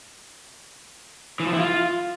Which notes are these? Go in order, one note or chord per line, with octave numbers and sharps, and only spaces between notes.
E3
F3
E4
F4